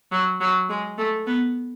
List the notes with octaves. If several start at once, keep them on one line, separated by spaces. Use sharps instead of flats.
F#3
F#3
G#3
A3
B3